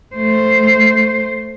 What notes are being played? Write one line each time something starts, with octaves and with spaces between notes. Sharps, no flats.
A3 C5